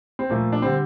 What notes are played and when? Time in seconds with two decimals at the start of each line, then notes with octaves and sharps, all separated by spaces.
0.19 C4
0.30 A#2 F3 A3 A#3
0.52 D4
0.62 D3 G3 C4